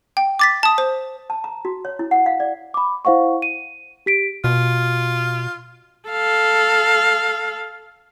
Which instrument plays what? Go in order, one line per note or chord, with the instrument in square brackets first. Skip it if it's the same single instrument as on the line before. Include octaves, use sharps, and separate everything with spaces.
[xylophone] G5
D6 A6 B6
A5 D#6
C5
[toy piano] A5
A#5
F#4
C#5
E4
F#5
F5
D5
[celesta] B5 D6
E4 C5 F5 F#5 C#6
D#7
G4 B6 D7
[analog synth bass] B2 [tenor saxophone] F4
[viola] A4 F5